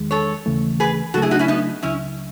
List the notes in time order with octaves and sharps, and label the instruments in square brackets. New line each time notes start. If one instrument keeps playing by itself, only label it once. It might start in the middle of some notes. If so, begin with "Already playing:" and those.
Already playing: [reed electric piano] E2 D#3 G#3
[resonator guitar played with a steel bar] A4 C#5
[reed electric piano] D#2 C#3 E3 A3
[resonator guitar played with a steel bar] G#4 B4
[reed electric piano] C#3 F#3 A3 [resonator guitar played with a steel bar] F#4 A4
[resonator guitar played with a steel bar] E4 G#4
D#4 F#4
C#4 E4
B3 D#4
[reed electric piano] C#2 C#3 F#3 [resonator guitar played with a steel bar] C#4 E4